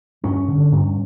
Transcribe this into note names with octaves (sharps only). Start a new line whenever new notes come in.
G2 C#4
D3
G2